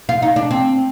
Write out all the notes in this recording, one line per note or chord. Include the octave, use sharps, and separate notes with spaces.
F4
D#4
D4
C4